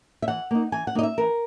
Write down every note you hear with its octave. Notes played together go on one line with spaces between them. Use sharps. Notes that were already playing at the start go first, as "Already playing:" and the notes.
E5
E3 F#5
A#3 D#4
E3 G#5
F#5
A#3 D#4 D#5
E5
E3 A#4